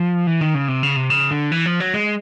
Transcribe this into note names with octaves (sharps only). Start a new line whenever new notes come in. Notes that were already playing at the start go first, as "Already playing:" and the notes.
Already playing: F3
E3
D#3
C#3
C3
C#3
C3
C#3
D3
E3
F3
F#3
G#3